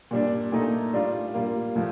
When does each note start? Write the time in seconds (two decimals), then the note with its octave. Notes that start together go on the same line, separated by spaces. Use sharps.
0.11 A#2 G3 D4
0.52 A#2 A3 D#4
0.93 A2 G3 D4 F4
1.34 A#2 G3 A#3 F4
1.76 A2 F3